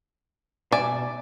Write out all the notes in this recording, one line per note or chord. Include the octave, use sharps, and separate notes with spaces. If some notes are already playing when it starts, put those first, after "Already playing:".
B2 D5 E5 G#5